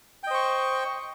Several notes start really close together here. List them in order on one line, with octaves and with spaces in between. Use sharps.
G5 D#5 C5 C#6